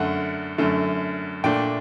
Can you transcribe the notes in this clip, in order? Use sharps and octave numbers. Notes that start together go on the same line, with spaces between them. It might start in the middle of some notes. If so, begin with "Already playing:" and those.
Already playing: F#2 D3 A3 F#5
F#2 D3 A3
A#2 A3 D4 G5